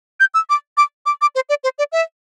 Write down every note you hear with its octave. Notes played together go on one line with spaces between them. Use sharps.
G6
E6
D6
D6
D6
D6
C5
D5
C5
D5
E5